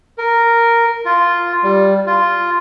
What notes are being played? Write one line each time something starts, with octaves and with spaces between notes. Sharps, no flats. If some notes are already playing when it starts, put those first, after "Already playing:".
A#4
F4
G3
F4